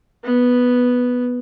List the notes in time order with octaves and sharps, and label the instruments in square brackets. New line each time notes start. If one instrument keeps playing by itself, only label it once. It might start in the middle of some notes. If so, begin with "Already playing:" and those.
[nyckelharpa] B3